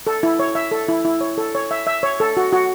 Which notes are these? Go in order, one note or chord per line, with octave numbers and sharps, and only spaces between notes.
A4
E4
C#5
E5
A4
E4
E4
C#5
A4
C#5
E5
E5
C#5
A4
F#4
F#4